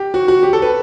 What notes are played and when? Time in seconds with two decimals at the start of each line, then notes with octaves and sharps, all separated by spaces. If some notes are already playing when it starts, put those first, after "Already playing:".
Already playing: G4
0.14 F#4
0.28 F#4
0.43 G4
0.53 A4
0.62 B4